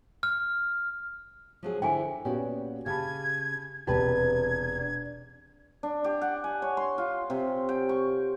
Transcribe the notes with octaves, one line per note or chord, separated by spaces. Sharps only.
F6
F3 F#3 G#4
D3 F3 E4 G5 G#5
A#2 B3 C#4 F#4 G4
C#3 G4 A5 B5 G#6
E1 C3 G4 B4 A5 G#6
D4
D4
G4
F#5
G#5
C#5
C6
F4
C3
G5
C#6